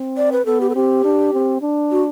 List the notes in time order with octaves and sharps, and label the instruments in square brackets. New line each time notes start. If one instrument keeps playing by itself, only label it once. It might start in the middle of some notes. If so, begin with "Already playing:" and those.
Already playing: [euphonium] C4
[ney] D5
B4
[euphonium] B3 [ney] A4
[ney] G4
A4
[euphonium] C4 [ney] G4
[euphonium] D4
C4
D4
[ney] F#4